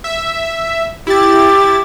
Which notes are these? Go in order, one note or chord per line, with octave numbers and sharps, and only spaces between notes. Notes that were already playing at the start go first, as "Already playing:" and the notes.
E5
E4 G4 A6